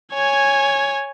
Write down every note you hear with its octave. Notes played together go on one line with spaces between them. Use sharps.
C#5 G#5